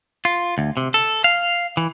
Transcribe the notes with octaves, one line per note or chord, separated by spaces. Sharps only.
F4
D2
C3
A4
F5
E3